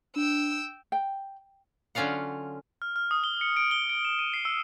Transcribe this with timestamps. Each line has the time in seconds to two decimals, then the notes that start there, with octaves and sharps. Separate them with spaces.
0.16 D4 G5 E6
0.92 G5
1.95 D3 F#3 C#4 F4 F5 F#5
2.82 F6
2.96 F6
3.11 D#6
3.24 G7
3.41 C#7
3.57 D7
3.71 G7
3.90 D7
4.05 E7
4.19 D#7
4.33 C7
4.45 E6